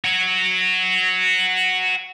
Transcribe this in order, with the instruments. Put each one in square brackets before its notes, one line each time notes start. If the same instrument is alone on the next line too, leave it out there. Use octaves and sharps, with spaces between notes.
[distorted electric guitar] F#4 C#5